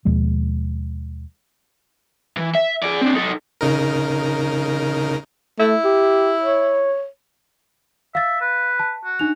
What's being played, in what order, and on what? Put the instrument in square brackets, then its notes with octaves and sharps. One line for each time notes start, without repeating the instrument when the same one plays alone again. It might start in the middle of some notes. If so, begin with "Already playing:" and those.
[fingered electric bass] D#2 B2 F3 G#3
[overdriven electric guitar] E3
E5
G#4 D5
C4 D4
D#4 A4
[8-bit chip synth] C#3 D#4 A#4
[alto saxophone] A3 [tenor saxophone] E4
[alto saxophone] G4
C#5
[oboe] E5 [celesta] F5 A6
[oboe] B4
[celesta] A5
[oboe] F#4
[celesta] D4 D#4 F7